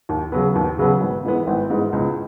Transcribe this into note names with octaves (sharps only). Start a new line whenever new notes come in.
D#2
C#3 F#3 B3
D#2
C#3 F#3 B3
G#1
G#2 E3 B3
G#1
G#2 E3 B3
C#2